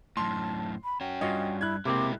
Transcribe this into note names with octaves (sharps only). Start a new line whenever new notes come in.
F#2 A2 A5 C6
B5
C#4 F#4 G5
G2 C#4 F4 F#4 D#5
E4 F#6 G#6
C3 G#3 A#3 C4 E4 D6